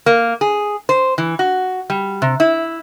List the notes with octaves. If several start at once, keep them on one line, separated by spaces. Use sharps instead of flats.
A#3
G#4
C5
E3
F#4
G3
C3
E4